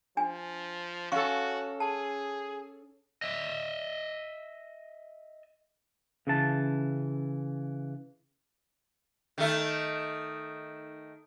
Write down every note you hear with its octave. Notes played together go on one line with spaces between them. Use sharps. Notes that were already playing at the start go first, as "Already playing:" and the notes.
F3 D4 G#5
C#4 F#4 A4 F5 C#6
G#4 A5
D#5 E5
C#3 E3 A5
D#3 A3